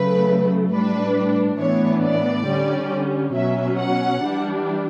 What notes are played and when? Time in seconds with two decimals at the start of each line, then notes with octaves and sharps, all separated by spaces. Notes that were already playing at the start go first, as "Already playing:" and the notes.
Already playing: C#3 F#3 A3 B4
0.71 A2 G3 D4 B4
1.59 A2 E3 B3 D4 C#5
2.03 D5
2.47 D3 G3 C#4
3.34 B2 F#3 C#4 E5
3.78 F#5
4.23 E3 G3 D4